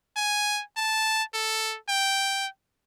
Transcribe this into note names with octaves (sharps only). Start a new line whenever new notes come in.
G#5
A5
A4
G5